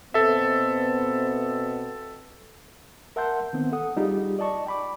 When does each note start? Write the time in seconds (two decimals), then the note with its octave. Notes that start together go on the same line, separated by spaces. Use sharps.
0.14 B2 B3 C4 A4 E5
3.16 A#4 E5 F#5 A5 C6 G6
3.53 D#3 B3 C4
3.72 A4 F#5 D#6
3.97 G3 D#4 F4 G4 G#4
4.39 D5 D#5 A5 C#6
4.66 G5 B5 D6